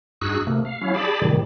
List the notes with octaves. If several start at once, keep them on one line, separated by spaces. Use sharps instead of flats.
G2 D#4 F#4 G#4 E6 F#6
C3 A3 A#3
F5
F#3 C#4 E4 F5
G4 G#4 D5 A5 B5
A2 C3 D#3 G3